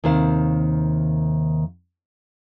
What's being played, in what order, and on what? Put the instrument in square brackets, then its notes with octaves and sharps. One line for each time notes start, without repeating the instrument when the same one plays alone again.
[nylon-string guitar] D#2 C3 D#3 C5 F5